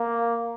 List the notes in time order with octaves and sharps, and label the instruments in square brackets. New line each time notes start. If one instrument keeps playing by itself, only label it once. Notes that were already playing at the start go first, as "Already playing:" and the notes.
Already playing: [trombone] A#3